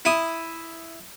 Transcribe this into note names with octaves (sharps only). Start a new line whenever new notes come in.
E4 D#6